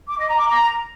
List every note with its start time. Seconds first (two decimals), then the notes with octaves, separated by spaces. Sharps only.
0.08 D6
0.18 D#5
0.28 A#5
0.38 D6
0.48 A#5